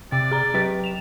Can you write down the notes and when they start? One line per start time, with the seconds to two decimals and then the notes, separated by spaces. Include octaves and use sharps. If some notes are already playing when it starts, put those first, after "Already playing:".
0.12 C3 D5
0.31 G#4 A#5
0.54 F#3 G4 B4
0.84 E7 F7